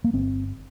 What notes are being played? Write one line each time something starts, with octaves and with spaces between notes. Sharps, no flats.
A#3
G1 C4